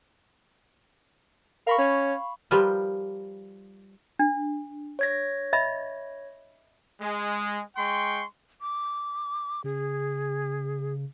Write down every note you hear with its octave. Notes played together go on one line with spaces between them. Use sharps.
A#4 F5 B5 C#6
C#4
F3 G3 F4 G4 A#4 B4
D4
C#5 G#6 A#6
D#5 E5 B5
G#3
G#3 G5 C6 C#6
D6
C#3 G#4